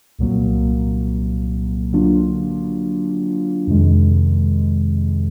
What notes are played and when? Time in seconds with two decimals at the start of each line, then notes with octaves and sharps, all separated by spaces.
0.19 C2 A#2 F#3 A#3
1.93 D3 F#3 A#3 D4 F4
3.67 F2 C3 D#3 G#3